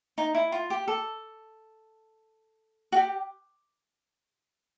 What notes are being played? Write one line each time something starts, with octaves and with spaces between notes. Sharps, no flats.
D#4
E4
F4
G4
A4
F#4
G4